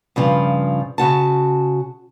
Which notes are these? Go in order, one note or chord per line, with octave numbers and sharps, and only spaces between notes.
G2 C#3 F3
C#3 F#4 A5